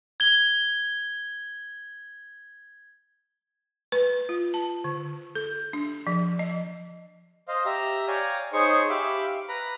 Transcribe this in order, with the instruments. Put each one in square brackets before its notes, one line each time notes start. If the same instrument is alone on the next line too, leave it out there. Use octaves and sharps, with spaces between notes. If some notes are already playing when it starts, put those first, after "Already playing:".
[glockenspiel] G#6 G7
[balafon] B4
F4
A5
D3
A4
D4
F3
D#5
[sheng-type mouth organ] C5 D#5 F5
G4 E5 A#5
C#5 D5 F5 G5 G#5 A#5
D#4 G#4 C5 C#5 C#6
G4 E5 F5 B5 D6
B4 A#5 B5